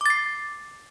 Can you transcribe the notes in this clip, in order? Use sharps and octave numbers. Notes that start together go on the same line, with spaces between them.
D6 A6 C7